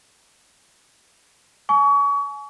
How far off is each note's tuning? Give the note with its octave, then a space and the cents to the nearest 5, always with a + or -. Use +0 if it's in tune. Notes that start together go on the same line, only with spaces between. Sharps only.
G#5 +30 C#6 +35